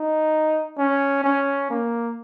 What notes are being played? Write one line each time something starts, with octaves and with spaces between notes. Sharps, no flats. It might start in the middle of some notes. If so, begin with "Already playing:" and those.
Already playing: D#4
C#4
C#4
A#3